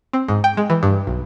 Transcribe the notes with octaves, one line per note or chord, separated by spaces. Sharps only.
C4
G#2
G5
G#3
E3
G2
B1